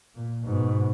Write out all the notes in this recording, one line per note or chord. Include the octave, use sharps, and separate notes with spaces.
A#2
G#2 B2